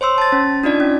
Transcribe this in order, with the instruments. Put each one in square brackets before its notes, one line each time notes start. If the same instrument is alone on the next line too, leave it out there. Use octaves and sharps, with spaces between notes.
[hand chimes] C5 C#5 C6 E6
A5 A6
C#4
D4 D#4 F4 D5 G#6
C#4